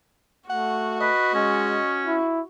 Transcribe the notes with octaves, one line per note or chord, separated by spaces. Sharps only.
A3 F#4 F#5
B4 D#5
G#3 C#4
E4